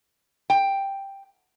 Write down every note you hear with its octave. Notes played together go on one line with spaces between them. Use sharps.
G5